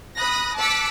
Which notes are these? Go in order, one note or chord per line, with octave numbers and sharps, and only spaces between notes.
B5 D#6 F#6 A#6
A5 D6 E6 F#6 B6 C#7